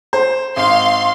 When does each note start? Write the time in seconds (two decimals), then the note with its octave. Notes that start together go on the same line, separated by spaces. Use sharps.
0.13 C5
0.57 G#1 F5 C6